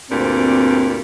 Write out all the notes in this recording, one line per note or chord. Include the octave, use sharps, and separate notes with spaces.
D2 G2 A#2 C4